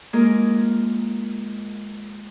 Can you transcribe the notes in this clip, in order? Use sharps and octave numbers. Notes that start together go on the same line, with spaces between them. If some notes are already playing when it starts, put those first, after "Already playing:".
G#3 A#3 F4 G#4 A#4